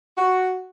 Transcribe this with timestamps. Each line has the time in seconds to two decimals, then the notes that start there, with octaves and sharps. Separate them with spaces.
0.15 F#4